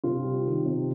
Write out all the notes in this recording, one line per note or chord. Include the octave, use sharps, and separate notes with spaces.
C3 F4
G3
D#3
C3